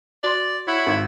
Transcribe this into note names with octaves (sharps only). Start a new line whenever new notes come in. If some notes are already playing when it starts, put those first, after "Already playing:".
F#4 D5 C6
E4 C#5 E5 F#5
G#1